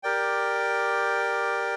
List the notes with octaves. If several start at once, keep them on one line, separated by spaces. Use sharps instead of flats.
G4 A#4 D5 G5